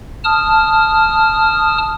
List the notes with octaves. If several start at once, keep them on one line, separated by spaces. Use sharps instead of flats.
A5 D#6 F6